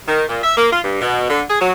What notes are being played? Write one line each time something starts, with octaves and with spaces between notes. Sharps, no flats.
D#3
A#2
E5
A#3
F4
G2
B2
D3
G#4
F#3